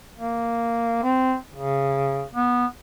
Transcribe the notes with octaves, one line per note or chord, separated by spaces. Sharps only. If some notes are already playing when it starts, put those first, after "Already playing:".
A#3
C4
C#3
B3